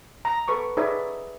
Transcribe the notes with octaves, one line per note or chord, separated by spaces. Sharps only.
A#5
A4 B4 C#6 D6
D#4 G#4 B4 C#5 D5 E5